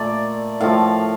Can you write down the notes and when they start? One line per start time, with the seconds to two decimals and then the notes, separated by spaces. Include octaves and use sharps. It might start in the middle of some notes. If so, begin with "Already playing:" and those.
Already playing: A#2 A3 D5
0.61 A2 F3 A3 F5